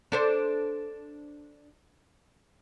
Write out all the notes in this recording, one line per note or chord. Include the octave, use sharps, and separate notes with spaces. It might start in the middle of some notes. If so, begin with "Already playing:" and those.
D4 A4 C5